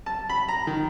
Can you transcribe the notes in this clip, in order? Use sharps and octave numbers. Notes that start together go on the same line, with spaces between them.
A5
B5
A#5
D#3